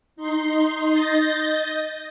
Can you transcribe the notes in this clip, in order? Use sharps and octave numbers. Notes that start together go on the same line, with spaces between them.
D#4 C6
D#5 G6 A6 A#6